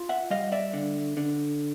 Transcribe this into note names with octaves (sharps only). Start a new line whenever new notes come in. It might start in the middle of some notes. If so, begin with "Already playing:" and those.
Already playing: F4
E5 F#5
G3 D#5 F5
D5 E5
D3
D3